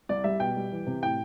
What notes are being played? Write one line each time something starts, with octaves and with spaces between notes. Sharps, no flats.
C2 D5
G3 E5
B2 G5
G3
E3
C3
A2 G5